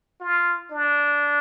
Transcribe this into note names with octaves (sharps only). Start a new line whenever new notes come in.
F4
D4